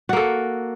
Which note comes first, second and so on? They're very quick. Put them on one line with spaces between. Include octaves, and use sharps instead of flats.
F#4 A#3 A4